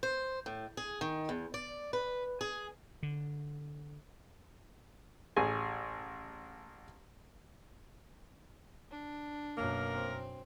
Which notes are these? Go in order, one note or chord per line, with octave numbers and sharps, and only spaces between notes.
C5
A2
G#4
D#3
E2
D5
B4
G#4
D3
A1 G#4 G#5
D4
F#2 B2 A#3 A#4
C4